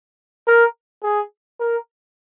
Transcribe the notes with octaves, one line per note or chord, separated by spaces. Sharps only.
A#4
G#4
A#4